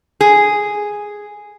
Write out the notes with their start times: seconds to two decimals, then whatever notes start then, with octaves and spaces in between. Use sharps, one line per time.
0.20 G#4